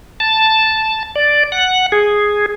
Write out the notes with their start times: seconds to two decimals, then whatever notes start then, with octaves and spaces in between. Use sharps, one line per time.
0.20 A5
1.16 D5
1.52 F#5
1.92 G#4